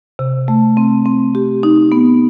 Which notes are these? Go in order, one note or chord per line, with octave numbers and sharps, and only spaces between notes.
C3
A3
C4
C4
G4
D#4
B3